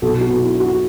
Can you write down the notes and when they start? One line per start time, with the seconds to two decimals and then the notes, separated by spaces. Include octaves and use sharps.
0.02 B1 F#4 A4
0.21 F#4
0.28 B2
0.40 E4
0.53 D4
0.60 F#4